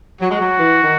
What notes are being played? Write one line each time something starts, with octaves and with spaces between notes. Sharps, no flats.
F#3 F#4
G#3
F#3
E3
D#3